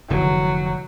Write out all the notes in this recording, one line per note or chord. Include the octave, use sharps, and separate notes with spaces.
F1 D3 E3 F#3